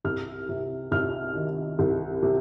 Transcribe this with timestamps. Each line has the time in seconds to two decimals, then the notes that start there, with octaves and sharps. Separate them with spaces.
0.05 C2 F6
0.49 C3
0.92 C2 F6
1.35 D#3
1.79 C2
2.22 C3